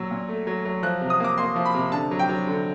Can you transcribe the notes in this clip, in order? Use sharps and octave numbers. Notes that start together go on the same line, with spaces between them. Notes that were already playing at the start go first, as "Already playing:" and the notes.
Already playing: A#2 F#3 E6
A#2
A3
F#3
F#3
F3 F#6
C3
D#6
A#3 D6
A#3 C6
F3
B5
C3
D3 A5
F#3
G5
F#3
D3